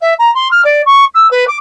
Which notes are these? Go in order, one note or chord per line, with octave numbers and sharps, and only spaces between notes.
E5
A#5
C6
F6
D5
C#6
E6
B4
D6